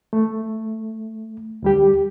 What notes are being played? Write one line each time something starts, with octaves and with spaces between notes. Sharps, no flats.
A3
D2 G3 G4